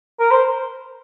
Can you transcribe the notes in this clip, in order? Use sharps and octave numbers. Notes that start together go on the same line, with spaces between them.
A#4
C5